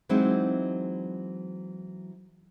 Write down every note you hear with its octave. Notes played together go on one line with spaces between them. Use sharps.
E3 F#3 G#3 C4 D#4 E4